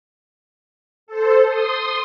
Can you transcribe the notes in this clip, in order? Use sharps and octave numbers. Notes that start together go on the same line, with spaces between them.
A4 C5
C6 D#6